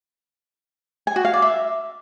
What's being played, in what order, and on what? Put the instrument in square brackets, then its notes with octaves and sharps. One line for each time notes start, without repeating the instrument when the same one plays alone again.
[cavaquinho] G#5
F#4
F5
D5
E5